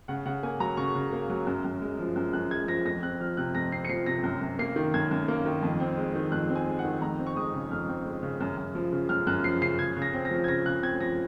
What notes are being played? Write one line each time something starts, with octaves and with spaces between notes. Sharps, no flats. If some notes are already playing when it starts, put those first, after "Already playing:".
C#3 F#5
C#3 F#5
A#3 G#5
F#3 A#5
C#3 C#6
C#3
A#3
F#3
F#2
F#2
G#3
F3
F#2
F#2 F#6
G#3 G#6
F3 A#6
F2 A#6
C4 F#6
F3 F6
C3 F#6
F2 A#6
C4 C7
C#7
F3 C7
C3 A#6
F#2
F#2
A#3 C7
D#3
F#2 G#6
F#2
A#3
D#3
F2
C4
G#3
D#3
F2 F#6
C4
G#5
G#3
F#5
D#3
F2 A#5
C4
C#6
G#3 D#6
C#3
F2 F6
C4
G#3
C#3
F#2
F#2
F3
C#3
F#2 F6
F#2 F#6
F3 C7
C#3 C7
C#3 G#6
C#3
A#6
C4
A#6
F3
G#6
C#3 A#6
C#3 F#6
C4 G#6
F3 A#6